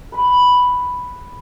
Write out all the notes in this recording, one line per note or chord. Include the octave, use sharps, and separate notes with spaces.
B4 B5